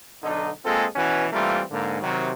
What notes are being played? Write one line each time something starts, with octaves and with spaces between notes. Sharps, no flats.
B1 D3 D#4
G#3 A#3 C4 F4 G#4 A4
B2 E3 C#4 F#4 B4
E3 G3 A3 A#3 C4 F4
G#2 D3 A#3
C3 D#3 F#3